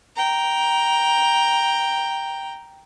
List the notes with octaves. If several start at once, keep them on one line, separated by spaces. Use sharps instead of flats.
G5 A#5